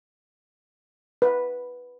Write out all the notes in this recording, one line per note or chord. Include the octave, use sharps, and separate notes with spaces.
B4